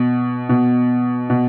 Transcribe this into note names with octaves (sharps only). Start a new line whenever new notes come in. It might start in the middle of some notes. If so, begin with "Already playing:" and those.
Already playing: B2
B2
B2